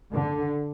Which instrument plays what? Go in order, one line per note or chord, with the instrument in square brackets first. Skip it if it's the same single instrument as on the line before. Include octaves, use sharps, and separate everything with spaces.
[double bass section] D3